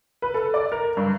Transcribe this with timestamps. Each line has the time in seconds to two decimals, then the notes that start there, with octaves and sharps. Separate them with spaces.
0.22 B4
0.34 A4
0.54 D5
0.72 A#4
0.97 G2